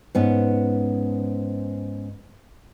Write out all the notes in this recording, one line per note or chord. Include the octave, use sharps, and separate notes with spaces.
G#2 B3 C#4